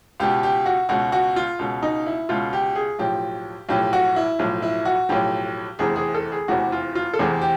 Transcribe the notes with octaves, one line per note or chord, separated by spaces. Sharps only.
C#2 B2 G4
G4
F#4
C#2 B2 F#4
F#4
F4
C#2 B2
D#4
E4
C#2 B2 F4
G4
G#4
B1 A2 F3 G4
B1 A2 F3 G4
F#4
E4
B1 A2 F3
E4
F#4
B1 A2 F3 G4
F1 E2 C3 E3 G#4
G#4
A4
G#4
F1 E2 C3 E3 F#4
F4
F4
A4
F1 E2 C3 E3 G#4
G4